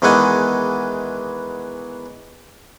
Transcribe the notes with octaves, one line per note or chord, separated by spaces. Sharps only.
E2 D#3 E3 G#3 F#5 G#5